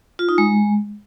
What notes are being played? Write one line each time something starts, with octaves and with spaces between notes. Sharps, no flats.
F4
D#4
G#3